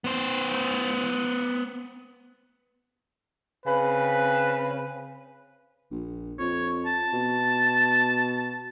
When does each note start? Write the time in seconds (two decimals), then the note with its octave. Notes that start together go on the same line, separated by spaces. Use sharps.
0.04 B3 C5
3.66 C#3 C4 B4
5.91 A#1
6.39 F2 C#5
6.86 A5
7.13 B2